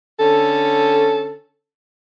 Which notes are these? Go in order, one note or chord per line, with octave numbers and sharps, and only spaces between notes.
D3 C#4 A4